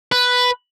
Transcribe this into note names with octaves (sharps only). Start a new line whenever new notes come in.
B4